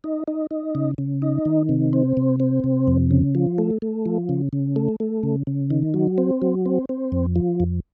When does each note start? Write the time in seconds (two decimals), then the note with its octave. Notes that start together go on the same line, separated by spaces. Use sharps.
0.04 D#4
0.28 D#4
0.51 D#4
0.75 C#3
0.98 C#3
1.22 D#4
1.45 D#3
1.69 C3
1.93 C4
2.17 C3
2.40 C4
2.64 C3
2.87 F2
3.11 C#3
3.35 F3
3.58 A3
3.82 A3
4.06 F3
4.29 C#3
4.53 C#3
4.76 A3
5.00 A3
5.23 C#3
5.47 C#3
5.70 D#3
5.94 F#3
6.18 C4
6.42 F#3
6.66 C4
6.89 C4
7.12 F2
7.36 F3
7.60 F2